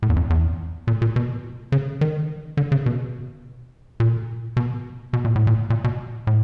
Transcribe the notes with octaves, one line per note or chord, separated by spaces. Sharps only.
A2
E2
F2
E2
A#2
A#2
B2
C#3
D#3
D3
C#3
B2
A#2
B2
B2
A#2
A2
A#2
A#2
B2
A2